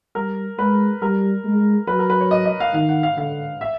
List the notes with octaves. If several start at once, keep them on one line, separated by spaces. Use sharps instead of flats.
G3 A#4
G#3 B4
G3 A#4
G#3
F#3 B4
A#4
B4
C#5
D#5
D#5
F5
D#3 F5
F#5
F5
D3 F5
E5